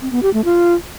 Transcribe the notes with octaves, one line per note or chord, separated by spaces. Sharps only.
C4
B3
G4
A3
F4